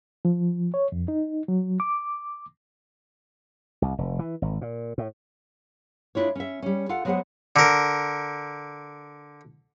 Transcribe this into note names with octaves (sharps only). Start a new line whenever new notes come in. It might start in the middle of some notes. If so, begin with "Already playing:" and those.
F3
C#5
F2
D#4
F#3
D6
C2
F1
E3
G#1
A#2
A2
G#3 D4 E4 F4 C#5
C#4 E5
G3 C#4
F4 A4 F5 F#5
F#3 G#3 B3 G4 C5 F#5
D3 A#4